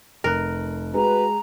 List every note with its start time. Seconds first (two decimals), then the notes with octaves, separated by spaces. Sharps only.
0.24 F1 A#4 F#6
0.94 G#3 F#4 B4 A#5